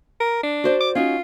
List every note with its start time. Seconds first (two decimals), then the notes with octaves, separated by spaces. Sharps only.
0.20 A#4
0.43 D4
0.64 F#4 C5 D5
0.81 D6
0.95 C#4 D#4 F4 F#4